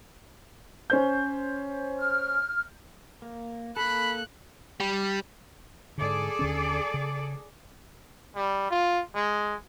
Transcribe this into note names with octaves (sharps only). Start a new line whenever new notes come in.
C#4 C5 G6
F6
A#3
A#3 A4 B5 F#6
G3
G#2 D3 G#4 A4 D5
D#2 D3 C#4
C#3
G3
F4
G#3